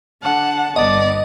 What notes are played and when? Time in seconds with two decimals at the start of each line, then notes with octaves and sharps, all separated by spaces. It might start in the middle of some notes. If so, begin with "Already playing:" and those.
0.23 D3 F#5 A5
0.76 G1 B3 D5 D#5